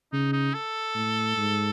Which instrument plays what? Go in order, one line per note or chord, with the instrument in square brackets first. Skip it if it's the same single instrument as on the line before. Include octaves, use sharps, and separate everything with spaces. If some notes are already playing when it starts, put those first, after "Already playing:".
[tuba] C#3 [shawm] D#4
[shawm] D#4
A4
[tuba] A2
G#2